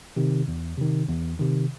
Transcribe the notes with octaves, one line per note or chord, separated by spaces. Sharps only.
C3 D#3
E2
C3 D#3
E2
C3 D#3